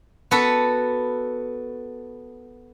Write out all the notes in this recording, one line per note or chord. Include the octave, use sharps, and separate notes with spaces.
B3 F#4 A4 B4